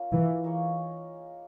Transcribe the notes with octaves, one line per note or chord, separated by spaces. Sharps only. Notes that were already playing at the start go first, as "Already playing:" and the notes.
Already playing: A#3 C#4 F4
E3
A#3 D#4 G#4 C#5